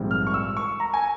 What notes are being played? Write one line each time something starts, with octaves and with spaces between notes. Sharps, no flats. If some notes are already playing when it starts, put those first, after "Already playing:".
Already playing: A#1 G#2 E3 G3 C4
F6
C#6
E6
C#6
A#5
G#5